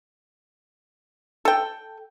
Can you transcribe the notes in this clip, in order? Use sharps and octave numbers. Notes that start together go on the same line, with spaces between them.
A4 G5